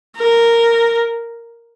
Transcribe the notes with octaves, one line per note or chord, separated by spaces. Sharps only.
A#4